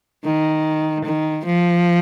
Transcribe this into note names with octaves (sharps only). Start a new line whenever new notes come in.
D#3
D#3
F3